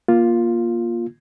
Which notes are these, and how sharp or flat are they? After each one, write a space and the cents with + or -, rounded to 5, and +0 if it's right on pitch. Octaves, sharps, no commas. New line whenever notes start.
A#3 +20 F4 +0